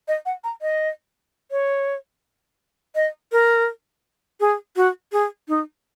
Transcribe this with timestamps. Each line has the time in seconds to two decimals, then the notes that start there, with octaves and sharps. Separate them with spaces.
0.08 D#5
0.26 F#5
0.44 A#5
0.62 D#5
1.51 C#5
2.95 D#5
3.32 A#4
4.40 G#4
4.76 F#4
5.12 G#4
5.49 D#4